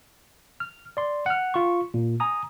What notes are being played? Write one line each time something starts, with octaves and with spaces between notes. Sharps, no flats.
F6
D5 C6
F#5 F6
F4 C#6
A#2
G#5 A#5 D#6